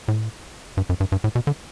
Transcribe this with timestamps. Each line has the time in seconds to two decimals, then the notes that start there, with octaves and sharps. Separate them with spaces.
0.08 A2
0.77 G2
0.89 F#2
1.00 G2
1.12 G2
1.24 A2
1.35 B2
1.47 D3